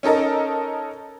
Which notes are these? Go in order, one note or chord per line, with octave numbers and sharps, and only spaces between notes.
C#4 D#4 A4 A#4 D#5